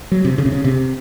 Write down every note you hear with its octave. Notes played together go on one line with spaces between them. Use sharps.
F#3
C3
C#3
C3
C#3
C3